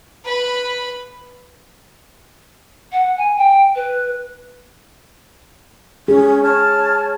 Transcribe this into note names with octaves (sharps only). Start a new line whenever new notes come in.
B4 B5
F#5
G#5
G5
B4
C#4 G#4
C#5 A5 F6